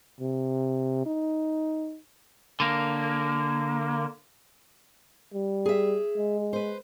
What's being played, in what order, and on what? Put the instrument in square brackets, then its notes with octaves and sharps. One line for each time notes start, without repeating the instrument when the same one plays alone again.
[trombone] C3
D#4
[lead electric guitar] D3 A#3
[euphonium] G3
[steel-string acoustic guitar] G#4 E5
[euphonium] G#3
[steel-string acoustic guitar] B4 C5